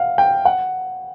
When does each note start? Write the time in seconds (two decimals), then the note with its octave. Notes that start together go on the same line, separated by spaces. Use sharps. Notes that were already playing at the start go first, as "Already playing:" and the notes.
Already playing: F5 F#5
0.18 G5
0.45 F#5